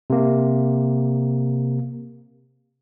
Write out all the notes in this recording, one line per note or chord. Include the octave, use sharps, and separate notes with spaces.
C3 A#3